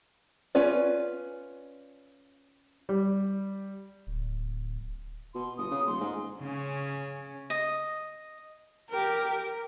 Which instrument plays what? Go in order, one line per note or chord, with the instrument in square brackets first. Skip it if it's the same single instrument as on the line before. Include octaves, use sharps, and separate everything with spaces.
[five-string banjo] C#4 F4 B4 D5
[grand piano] G3
[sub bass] D1
[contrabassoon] B2 [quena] C6
[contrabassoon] G1 [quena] D#6
[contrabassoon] C#3
[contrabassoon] D#1 [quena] C6
[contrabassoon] G#2
[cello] C#3 C#4
[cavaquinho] D#5
[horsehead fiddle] G4 A#4
A#4